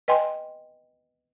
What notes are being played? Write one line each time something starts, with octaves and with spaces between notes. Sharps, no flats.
B4 D#5 G5 G#5 C6